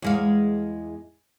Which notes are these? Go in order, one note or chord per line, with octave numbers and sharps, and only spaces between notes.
E2 G#3 F5